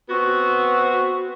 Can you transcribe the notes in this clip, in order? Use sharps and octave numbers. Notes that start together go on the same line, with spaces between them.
B3 C4 F#4